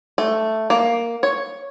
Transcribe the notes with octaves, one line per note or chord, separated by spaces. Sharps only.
A3
A#3
C#5